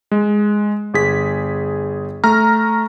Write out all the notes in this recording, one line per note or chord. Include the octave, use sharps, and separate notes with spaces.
G#3
G1 G#4 B6
A3 A#5 F6